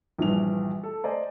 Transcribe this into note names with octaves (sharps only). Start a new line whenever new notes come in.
A#1 G2 E3 G3 F7
A4
C5 D5 D#5 G#5